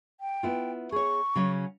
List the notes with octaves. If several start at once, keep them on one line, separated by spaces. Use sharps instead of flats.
G5
B3 E4 F4
G#4 C#5 C#6
C#3 F#3 C#4